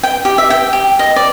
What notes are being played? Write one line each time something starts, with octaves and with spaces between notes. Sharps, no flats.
G5
G4
E5
G5
G4
D#5
D5